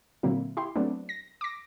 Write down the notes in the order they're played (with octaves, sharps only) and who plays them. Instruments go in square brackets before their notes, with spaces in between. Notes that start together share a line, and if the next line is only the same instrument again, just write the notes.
[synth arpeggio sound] A#2 D3 F#3 A#3 C4 E4
E4 G4 C6
F#3 A3 B3 C4 D4
A#6
D6 A#6